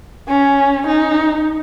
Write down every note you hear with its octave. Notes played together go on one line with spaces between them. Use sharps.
C#4
D#4